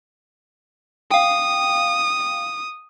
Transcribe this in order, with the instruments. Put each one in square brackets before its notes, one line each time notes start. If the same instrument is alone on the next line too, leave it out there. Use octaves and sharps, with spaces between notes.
[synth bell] F5 G5 [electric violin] D#6